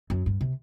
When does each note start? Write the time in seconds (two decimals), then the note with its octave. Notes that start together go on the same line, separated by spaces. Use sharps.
0.10 F#2
0.26 G2
0.41 C3